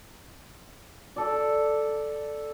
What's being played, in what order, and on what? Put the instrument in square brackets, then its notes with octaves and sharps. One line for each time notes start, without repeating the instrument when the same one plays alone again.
[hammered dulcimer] A4 D5